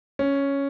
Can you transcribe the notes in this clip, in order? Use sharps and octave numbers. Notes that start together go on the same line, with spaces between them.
C#4